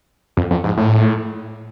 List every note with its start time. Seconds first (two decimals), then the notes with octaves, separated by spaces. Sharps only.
0.37 F2
0.51 F2
0.64 G#2
0.77 A2